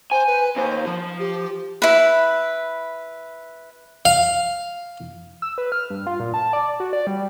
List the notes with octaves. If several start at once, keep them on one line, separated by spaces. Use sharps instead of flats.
C5 G#5
B4
D#2 C5
F3
G4
E4 B4
F5
E6
B4
F6
G2
F4
A#2
A5
D5
F#4
D5
G3